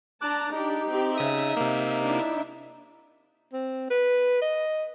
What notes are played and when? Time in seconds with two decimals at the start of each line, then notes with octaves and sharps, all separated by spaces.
0.21 D4 A5 A#5 D6 F#6
0.51 D4 D#4 G4
0.89 C4 G4
1.18 C#3 E5 D#6
1.57 C3 A#3
2.03 D4 E4 E5
3.53 C4
3.90 B4
4.42 D#5